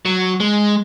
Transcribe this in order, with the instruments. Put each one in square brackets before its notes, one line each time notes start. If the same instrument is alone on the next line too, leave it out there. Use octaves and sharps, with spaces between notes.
[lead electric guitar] F#3
G#3